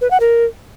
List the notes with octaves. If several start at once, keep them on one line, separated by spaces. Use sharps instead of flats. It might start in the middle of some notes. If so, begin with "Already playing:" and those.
B4
F#5
A#4